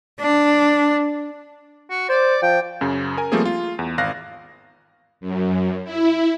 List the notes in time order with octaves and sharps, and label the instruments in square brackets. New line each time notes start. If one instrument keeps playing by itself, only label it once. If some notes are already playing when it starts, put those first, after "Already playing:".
[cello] D4
[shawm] F#4
[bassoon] C5 [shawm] D5
[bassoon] F3 [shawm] G5
[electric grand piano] F#2 C#3
A#4 G#5
F3 G3 A3 A#3 C4 G#4
F4
E2
G#1 F5 F#6 A#6
[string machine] F#2
E4